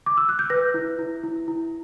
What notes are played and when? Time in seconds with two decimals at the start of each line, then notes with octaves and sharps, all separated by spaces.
0.06 D6
0.17 E6
0.29 F#6
0.39 G6
0.50 B4 A#6
0.74 E4
0.99 E4
1.23 E4
1.48 E4